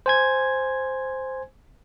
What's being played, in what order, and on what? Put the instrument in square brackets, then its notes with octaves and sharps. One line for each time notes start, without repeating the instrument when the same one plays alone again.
[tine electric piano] C5 G#5 G#6